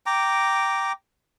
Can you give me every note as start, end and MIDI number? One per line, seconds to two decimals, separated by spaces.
0.06 0.92 79
0.06 0.92 82
0.06 0.92 86